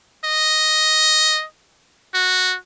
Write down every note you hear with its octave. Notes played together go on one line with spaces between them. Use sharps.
D#5
F#4